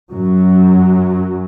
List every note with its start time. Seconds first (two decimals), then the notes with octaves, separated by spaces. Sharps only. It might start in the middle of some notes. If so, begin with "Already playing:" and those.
0.11 F#2 F#3